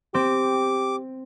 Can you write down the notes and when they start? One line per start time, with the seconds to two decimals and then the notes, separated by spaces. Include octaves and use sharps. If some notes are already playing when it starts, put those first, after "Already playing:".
0.14 C4 G4 D6